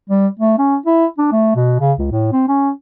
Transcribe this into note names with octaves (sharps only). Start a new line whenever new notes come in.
G3
A3
C#4
E4
D4
A3
B2
C#3
C#2
A2
C4
C#4